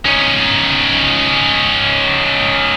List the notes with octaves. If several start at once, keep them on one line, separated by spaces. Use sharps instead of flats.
C#4 D#4